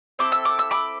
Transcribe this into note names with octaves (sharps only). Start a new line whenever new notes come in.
C4 E4 A4 D6
E6
D6
E6
B5 D6